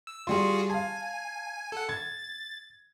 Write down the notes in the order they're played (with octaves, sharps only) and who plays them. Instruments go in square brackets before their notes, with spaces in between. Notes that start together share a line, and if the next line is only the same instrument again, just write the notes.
[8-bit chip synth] E6
[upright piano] G3 C6 [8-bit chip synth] F4 F#4 G#4
[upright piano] F5 A5 [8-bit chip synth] G#5
[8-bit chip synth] A4 F#5
[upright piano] G#6 [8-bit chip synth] A6